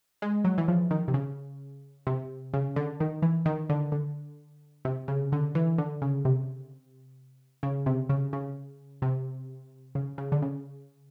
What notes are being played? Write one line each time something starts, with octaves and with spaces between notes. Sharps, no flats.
G#3
F#3
E3
F3
D#3
C3
C#3
C3
C#3
D3
D#3
E3
D#3
D3
D3
C3
C#3
D3
E3
D3
C#3
C3
C#3
C3
C#3
C#3
C3
C#3
C#3
D3
C#3